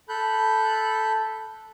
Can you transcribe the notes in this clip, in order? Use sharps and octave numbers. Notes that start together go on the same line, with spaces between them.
A4 B5 F#6 G6